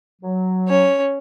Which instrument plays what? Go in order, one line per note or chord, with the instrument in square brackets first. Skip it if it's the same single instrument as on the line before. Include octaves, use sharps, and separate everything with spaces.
[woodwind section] F#3
[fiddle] C#4 C#5